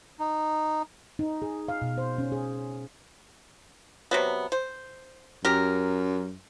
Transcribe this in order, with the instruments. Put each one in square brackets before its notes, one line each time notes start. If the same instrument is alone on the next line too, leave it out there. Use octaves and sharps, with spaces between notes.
[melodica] D#4
[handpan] D#4
G#4
F5
B2
C5
C#4
G#4
[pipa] C3 F#3 B3
C5
[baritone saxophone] F#2 [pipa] G4 A#4